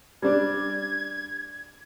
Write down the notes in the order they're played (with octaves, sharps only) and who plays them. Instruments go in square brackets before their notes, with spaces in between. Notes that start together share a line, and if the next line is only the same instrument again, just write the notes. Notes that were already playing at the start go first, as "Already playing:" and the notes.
[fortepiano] G3 D4 [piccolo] G#6